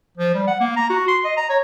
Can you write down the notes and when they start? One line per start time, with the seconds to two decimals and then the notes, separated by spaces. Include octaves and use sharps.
0.17 F3
0.34 G3
0.47 F#5
0.60 A#3
0.76 A#5
0.90 F#4
1.08 C6
1.25 D#5
1.37 A#5
1.50 C#5